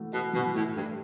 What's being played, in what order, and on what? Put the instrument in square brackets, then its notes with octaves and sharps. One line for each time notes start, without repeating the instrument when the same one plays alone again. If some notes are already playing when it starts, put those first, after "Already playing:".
Already playing: [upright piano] E3 A3 F#4
[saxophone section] B2 [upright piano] F#4
[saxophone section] B2 [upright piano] E3
[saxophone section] A2 [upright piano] A3
[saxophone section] G2 [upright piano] A3